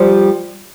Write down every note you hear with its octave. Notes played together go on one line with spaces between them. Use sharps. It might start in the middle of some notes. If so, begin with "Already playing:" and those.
Already playing: F3 G3